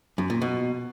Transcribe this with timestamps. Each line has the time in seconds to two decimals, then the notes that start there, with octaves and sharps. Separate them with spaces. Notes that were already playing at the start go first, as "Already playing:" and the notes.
0.18 F#2
0.30 A#2
0.42 B2